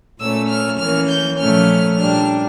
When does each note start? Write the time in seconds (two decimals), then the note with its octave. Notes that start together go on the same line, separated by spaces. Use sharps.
0.19 A#2 A3 C#4 E6
0.49 F6
0.79 E3 A#3 C#4 F6
1.09 G6
1.38 A#2 F3 A3 C#4 F6
1.98 A#2 G3 D4 F6